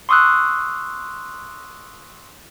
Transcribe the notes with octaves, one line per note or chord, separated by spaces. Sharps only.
C6 C#6 D#6 E6 F#6